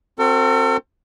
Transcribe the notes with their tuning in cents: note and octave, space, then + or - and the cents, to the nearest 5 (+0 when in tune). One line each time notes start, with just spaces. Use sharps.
C4 +15 F#4 +0 A4 +45